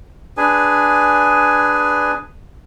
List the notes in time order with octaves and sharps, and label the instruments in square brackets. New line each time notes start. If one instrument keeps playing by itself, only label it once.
[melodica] D4 G#4 B4 G#5